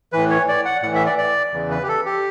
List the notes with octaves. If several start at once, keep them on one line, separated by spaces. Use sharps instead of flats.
A2 E3 B4
C#5
D5
F#5
A2 E3 F#5
E5
D5
D5
E2 C#3 E3
B4
G4
A4
G4